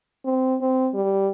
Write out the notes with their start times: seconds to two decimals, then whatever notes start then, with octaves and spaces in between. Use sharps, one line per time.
0.25 C4
0.61 C4
0.94 G3